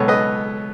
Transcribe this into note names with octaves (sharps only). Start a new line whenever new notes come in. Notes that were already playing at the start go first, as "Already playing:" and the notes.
Already playing: C#2 B2 F#3 B3 A4 C#5
B4 D#5